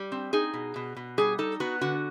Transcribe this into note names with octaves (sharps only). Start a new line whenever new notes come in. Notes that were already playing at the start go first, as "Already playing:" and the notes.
Already playing: G3
C4
D#4 G#4
B2
B2
B2
G3 G#4
D#4 A4
B3 F#4
D3 F#4